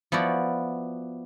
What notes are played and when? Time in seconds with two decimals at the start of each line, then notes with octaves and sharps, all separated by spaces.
0.12 F3 B3 E4 F#4 D5